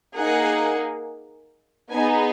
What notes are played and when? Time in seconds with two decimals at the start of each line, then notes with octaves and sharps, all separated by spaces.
0.16 A#3 D#4 G#4 F#5
1.91 B3 D#4 G#4 G#5